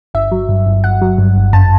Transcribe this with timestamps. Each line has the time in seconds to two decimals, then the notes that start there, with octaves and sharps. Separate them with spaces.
0.14 G1 E5
0.31 F#3
0.49 G2
0.66 G1
0.84 G1 F#5
1.02 F#3
1.18 G2
1.36 G1
1.53 F#2 A5